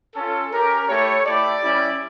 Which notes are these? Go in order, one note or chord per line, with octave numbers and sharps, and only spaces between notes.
C#4 F4 A4
C#4 G4 A#4
A3 E4 G4 C#5
A3 E4 G4 D5
G3 C#4 E4 G4